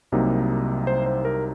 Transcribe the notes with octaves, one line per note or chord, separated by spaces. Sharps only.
C2 C3 F#3 A#3 D#4
C5
C5
A#4